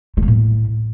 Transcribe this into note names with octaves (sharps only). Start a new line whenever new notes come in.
A3
A#3
A2